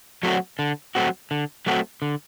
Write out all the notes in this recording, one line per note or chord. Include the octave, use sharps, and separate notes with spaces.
F#3 A3 C4 F#4
D3
F#3 A3 C4 F#4
D3
F#3 A3 C4 F#4
D3